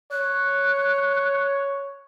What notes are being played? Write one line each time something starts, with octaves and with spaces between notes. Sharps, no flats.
C#5 F#6